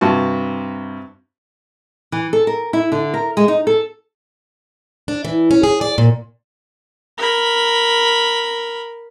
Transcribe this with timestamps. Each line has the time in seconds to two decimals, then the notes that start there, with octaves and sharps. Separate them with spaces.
0.01 G2 C3 F#4 A5
2.12 E3
2.33 A4
2.47 A#4
2.73 E4
2.92 D3
3.14 A#4
3.37 G#3
3.48 D#4
3.67 A4
5.08 D4
5.25 E3
5.51 C#4
5.63 G#4
5.81 D5
5.98 A#2
7.18 A#4 B5